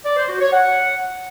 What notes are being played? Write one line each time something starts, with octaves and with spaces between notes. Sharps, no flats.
D5
C5
F#4
C#5
F#5